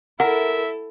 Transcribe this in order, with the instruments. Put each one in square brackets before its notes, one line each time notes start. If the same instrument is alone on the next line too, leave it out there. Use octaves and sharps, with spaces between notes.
[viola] E4 A4 [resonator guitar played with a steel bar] A#4 [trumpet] E5 [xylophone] F#5